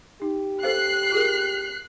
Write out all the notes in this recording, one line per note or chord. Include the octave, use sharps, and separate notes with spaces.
D#4 G4
A4 C5 F5 F#6 C7
F4 G#4 A#4